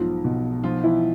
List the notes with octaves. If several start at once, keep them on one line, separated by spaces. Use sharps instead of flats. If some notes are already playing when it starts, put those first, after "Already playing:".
Already playing: B1 G#2 F3 F4
B2
F3 F4
E3 E4